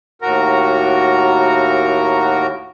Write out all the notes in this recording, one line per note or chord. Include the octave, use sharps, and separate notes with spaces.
D#2 A2 F#4 A#4 A#5